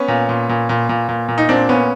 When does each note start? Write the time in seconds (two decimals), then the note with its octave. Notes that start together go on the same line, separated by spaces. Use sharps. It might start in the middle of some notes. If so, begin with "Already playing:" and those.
Already playing: B3 C#4
0.08 A#2
0.29 A#2
0.49 A#2
0.69 A#2
0.89 A#2
1.09 A#2
1.29 A#2
1.38 D#4
1.49 A#2 C4 D4
1.69 A#2 B3 C#4